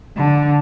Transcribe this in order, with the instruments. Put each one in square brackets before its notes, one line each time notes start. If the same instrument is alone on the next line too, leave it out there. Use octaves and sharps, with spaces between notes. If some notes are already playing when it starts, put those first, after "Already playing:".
[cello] D3